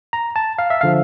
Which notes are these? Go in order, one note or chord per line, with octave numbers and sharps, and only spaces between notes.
A#5
A5
F5
E5
D3 F3 F5